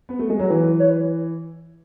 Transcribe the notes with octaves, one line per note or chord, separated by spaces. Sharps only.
B3
A3
G#3
F#3 C#5
E3 B4
C#5
B4